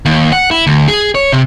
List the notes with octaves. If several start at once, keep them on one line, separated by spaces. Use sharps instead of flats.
D#2
F#5
E4
D2
G#4
C#5
C3